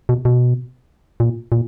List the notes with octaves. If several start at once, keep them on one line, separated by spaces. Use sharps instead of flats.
B2
B2
A#2
A#2